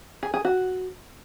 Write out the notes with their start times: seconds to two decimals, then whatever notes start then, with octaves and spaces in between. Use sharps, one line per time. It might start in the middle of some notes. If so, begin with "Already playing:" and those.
0.23 G#4
0.34 G#4
0.45 F#4